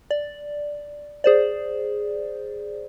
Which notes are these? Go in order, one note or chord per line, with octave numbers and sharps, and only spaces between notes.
D5
G#4 C5 D5